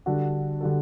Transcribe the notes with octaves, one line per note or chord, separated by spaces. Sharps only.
D3 G3 D4 F#4 A4
D3 G3 D4 F#4 A4